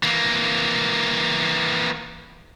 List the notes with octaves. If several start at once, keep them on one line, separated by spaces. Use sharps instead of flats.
E3 A#3